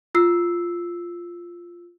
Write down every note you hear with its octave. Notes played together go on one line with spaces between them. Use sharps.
F4 E6 C7